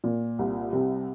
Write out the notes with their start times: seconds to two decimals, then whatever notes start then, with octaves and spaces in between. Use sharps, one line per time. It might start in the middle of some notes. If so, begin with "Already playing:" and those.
0.04 A#2
0.39 C2
0.73 C3